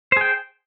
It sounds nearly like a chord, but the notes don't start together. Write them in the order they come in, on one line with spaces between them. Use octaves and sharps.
C5 G#4 G5